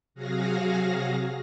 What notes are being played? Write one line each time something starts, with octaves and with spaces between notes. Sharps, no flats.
C3 F#3 F#4 G#4 F5 A#6